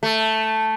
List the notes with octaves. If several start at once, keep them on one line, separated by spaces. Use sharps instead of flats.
A3